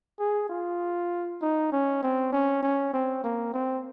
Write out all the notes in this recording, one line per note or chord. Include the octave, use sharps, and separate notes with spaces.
G#4
F4
D#4
C#4
C4
C#4
C#4
C4
A#3
C4